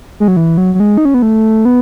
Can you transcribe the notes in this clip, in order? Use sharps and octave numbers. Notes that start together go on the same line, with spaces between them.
G#3
F#3
E3
F#3
F#3
G#3
D#4
C#4
B3
A3
B3